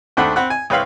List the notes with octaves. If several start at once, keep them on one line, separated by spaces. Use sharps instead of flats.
D#2 A3 D4 C5 F#5 B5
C4 F#5 B5 F#6
G#5
C2 C4 B4 C#5 F5 B5